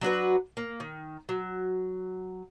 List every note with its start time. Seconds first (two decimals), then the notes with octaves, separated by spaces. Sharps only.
0.01 F#3 D4 F#4 B4
0.57 A#3
0.80 D#3
1.29 F#3